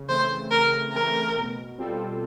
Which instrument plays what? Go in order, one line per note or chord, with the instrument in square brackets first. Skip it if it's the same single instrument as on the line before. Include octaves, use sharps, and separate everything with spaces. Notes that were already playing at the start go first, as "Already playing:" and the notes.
Already playing: [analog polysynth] C#3
[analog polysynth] E3 A3 C4 [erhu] C5
[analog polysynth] C#3 [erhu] A#4
[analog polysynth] E3 A3 C4 [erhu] A#4
[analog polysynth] B2
G3 C4 F4 A4